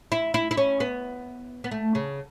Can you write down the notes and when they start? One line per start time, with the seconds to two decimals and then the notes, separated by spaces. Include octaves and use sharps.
0.12 E4
0.34 E4
0.51 E4
0.57 C#4
0.80 B3
1.64 B3
1.71 A3
1.95 C#3